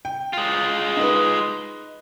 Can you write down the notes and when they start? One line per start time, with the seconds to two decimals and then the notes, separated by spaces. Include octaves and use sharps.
0.05 G5
0.33 G#3 F4
0.97 D#4 B4